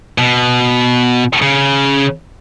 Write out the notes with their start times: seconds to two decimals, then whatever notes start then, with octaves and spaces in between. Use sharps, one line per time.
0.18 B2
1.42 C#3